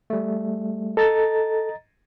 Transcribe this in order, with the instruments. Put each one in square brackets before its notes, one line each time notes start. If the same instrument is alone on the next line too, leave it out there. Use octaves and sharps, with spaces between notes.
[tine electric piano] G3 A3
[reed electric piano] A4 [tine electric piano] D#5 A#5 A6